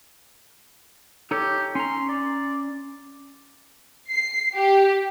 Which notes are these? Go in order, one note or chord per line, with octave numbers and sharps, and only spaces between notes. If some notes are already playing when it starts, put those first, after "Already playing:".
D#4 G4 A4 C#5
C#4 A#5 C6
D5
C7
G4